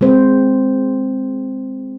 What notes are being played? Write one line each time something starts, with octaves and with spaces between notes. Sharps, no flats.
G#3 C4 C5